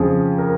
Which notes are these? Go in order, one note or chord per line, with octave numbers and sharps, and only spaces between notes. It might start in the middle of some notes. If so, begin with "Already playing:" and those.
Already playing: F2 C#3 F3 G#4
A#4